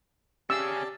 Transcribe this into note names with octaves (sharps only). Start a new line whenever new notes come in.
C#4 G4 G#4 D5 A5 E6